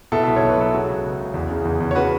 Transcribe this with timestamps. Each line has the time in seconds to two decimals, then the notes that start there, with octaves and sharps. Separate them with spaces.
0.12 B2 E4 A4
0.24 B1 E5
0.36 C#5
0.43 B1
0.49 B4
0.57 F#3 A4
0.73 C#3 F#4
0.88 C#2
1.04 C#2
1.19 C#2
1.34 E2
1.50 C#3
1.65 E2
1.80 E2
1.91 C#5
1.95 C#3 F#4 B4